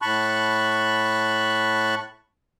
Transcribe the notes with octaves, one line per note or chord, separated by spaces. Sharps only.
A2 A5 B5 C#6 F#6